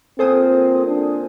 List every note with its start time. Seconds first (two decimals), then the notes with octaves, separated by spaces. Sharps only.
0.19 A#2 C4 G#4 A4 C5 D#6
0.87 D4